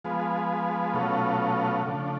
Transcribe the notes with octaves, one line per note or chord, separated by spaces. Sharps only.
F3 G#3 B3
B2 F#3 A3 C#4 F4
C#3 F3 A3 D4